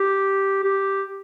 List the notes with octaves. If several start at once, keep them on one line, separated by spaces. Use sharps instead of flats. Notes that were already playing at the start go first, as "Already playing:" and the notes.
Already playing: G4
G4